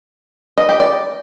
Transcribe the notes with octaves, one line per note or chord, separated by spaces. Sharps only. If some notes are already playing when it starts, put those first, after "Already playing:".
D#5
G4
D5